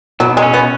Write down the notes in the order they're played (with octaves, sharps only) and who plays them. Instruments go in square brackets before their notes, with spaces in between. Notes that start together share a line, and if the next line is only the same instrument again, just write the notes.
[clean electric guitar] B2 [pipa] F#3
[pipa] G#3
[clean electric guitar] C#4
[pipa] B3